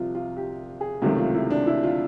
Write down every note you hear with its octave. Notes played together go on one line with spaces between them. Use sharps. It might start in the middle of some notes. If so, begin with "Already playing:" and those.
Already playing: C2 C3 F3 F4
F4
G4
G#4
C#2 C3 D#3 F#3 A3 F#4
F4
E4
D4
E4
F4